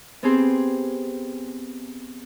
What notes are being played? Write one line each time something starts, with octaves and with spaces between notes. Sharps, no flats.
B3 C4 G4 G#4 C5